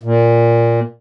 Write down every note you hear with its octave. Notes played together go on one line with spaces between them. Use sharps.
A#2